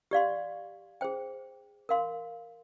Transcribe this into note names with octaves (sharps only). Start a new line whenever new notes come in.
G4 D5 F5 C6
G#4 C5 G5
A#4 F5 C6